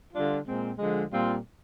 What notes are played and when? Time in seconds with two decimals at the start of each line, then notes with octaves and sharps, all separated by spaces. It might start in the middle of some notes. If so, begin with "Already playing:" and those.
0.14 D3 G3 D4 F4
0.45 A#2 G#3 C4
0.78 D3 F3 G#3
1.10 A#2 G3 C4 F4